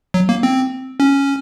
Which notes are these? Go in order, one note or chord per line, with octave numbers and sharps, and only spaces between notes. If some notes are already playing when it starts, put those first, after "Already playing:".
F#3
A#3
C4
C#4